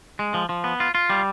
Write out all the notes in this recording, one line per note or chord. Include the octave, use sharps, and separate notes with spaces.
G#3
F3
F3
B3
F4
F4
G3